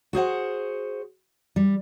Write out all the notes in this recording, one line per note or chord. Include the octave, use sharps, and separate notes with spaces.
F#4 G#4 C5 F#5
G3